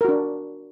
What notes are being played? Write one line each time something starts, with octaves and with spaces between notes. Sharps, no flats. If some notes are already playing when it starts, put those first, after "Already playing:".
D4 F#4 A#4